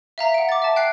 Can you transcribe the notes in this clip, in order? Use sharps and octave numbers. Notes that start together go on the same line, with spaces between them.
E5 F5 A#5 B6
F#5 D7
D6 A6
E5 A5
G5 F#6 C7